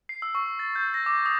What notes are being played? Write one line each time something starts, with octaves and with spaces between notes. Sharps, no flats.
C7
E6
C#6
E6
A6
G6
A#6
D6
D#6